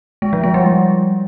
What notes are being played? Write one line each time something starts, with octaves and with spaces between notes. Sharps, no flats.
G#3
F3
G#3
G3